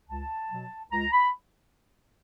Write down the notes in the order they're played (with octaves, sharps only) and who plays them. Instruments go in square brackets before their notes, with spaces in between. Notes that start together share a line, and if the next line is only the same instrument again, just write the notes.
[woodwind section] C#2 A5
B2 F#3
C#2 A#5
B5